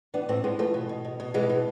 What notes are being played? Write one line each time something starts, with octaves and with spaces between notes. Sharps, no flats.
E3 B3 D4
A2 A3 C4
A2 G#3 B3
E3 F3 A3
B2
B2
B2
B2
B2 E3 G#3
B2